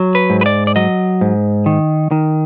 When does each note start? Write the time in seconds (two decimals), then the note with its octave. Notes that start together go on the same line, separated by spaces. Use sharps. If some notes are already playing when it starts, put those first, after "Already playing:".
Already playing: F#3
0.15 B4
0.30 G#2
0.41 B4
0.46 D5
0.67 D5
0.76 F#3 D#5
1.21 G#2
1.66 D#3
2.11 D#3